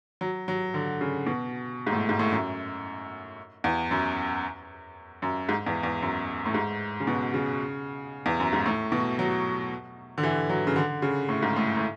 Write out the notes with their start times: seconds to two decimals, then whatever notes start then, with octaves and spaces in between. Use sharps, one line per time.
0.21 F#3
0.48 F#3
0.74 D3
1.01 C#3
1.26 B2
1.87 G#2
1.93 A2
2.09 G#2
2.19 A2
2.32 F#2
3.64 E2
3.91 F#2
5.22 F#2
5.49 G#2
5.66 E2
5.83 E2
6.02 F#2
6.46 A2
6.54 G#2
7.00 C#3
7.07 B2
7.34 C#3
8.26 E2
8.40 F#2
8.52 G#2
8.66 A2
8.92 B2
9.19 F#3
10.18 D3
10.23 E3
10.50 F#3
10.67 C#3
10.76 D3
11.02 C#3
11.29 A2
11.42 G#2
11.57 A2
11.77 A2